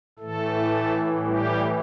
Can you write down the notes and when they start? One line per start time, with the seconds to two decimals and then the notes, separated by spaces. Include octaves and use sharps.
0.19 A2 E3 A3 A4
1.24 G3 G4